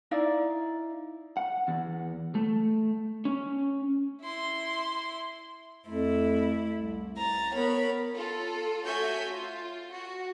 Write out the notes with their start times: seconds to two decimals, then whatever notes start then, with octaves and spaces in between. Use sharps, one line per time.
0.11 D#4 E4 D5 F5
1.37 F#5
1.68 E2
2.35 A3
3.25 C#4
4.21 E4 C6
5.86 F2 A3 E4
6.73 C2
7.17 A#5 A6
7.53 B3 A#4 C#5 B5
8.15 F4 A4
8.85 A3 F#4 C#5 E5 G#5 G6
9.28 F4
9.91 F#4